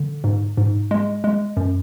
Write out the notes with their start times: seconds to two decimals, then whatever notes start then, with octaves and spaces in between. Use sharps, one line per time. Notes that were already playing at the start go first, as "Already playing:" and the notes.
Already playing: D3
0.24 G#2
0.57 G#2
0.91 G#3
1.24 G#3
1.57 F#2